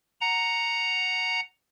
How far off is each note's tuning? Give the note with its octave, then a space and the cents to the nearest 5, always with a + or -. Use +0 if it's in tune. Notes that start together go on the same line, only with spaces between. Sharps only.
F#5 +0 A#5 +0